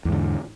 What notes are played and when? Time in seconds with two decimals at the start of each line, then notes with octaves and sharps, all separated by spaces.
0.05 E2
0.09 G#2
0.12 D3